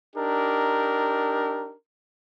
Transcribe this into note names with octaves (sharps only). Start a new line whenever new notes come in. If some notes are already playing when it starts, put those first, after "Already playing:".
D4 D#4 G4 A#4